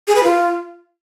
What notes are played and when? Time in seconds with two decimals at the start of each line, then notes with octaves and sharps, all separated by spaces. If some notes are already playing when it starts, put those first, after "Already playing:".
0.08 G#4
0.16 B4
0.24 F4